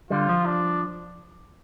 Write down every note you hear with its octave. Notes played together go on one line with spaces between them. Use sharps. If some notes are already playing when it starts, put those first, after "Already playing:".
D3 G3 F4
F3
D4